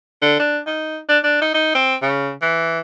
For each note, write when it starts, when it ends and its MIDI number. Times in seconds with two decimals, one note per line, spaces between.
0.22 0.38 50
0.39 0.59 62
0.67 0.99 63
1.09 1.18 62
1.24 1.38 62
1.42 1.51 63
1.54 1.73 63
1.75 1.95 60
2.02 2.31 49
2.42 2.79 52